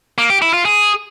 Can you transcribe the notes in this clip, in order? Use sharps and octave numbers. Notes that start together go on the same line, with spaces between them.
A#3
G4
E4
F4
G#4